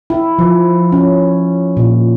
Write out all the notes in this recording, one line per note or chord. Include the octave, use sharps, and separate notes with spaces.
E4
F3
C#4
A#2